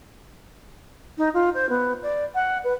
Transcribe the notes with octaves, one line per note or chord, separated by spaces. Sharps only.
D#4
F4
C5
B3
D5
F#5
B4